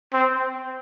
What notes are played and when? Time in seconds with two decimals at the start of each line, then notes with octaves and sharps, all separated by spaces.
0.13 C4